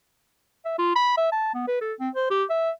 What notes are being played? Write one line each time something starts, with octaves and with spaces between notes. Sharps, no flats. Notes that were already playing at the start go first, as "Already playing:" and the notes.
E5
F4
B5
E5
A5
B3
B4
A4
C4
C5
G4
E5